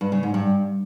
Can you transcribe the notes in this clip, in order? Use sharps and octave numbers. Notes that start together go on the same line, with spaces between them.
G2
C#3
G#2
G2